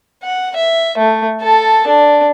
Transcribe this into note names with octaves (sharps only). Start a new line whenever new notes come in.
F#5
E5
A3
A4 A5
D4